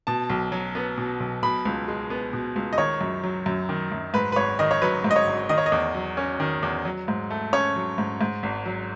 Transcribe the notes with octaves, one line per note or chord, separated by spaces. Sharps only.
B2 A5
B1
F#3
B3
B2
B1
B2 B5
C#2
G#3
B3
B2
C#2
D#5
D#3 C#5
F#2
F#3
F#2
D#3
F#2
G#2 B4
B4
G#1 C#5
D#3 D#5
C#5
F#3 B4
G#2
D#5
C#5
G#1
D#3 D#5
C#5
D#5
E2
F#3
C#4
D#3
E2
F#3
G#2
A3
C#4 C#5
F#3
G#2
G#2
G#1
F#3